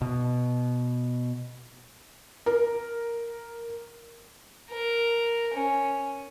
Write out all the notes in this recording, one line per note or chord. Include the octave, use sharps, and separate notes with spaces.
B2
A#4
A#4
C#4